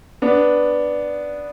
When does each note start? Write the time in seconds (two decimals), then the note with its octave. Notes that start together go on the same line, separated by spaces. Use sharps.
0.22 B3 D4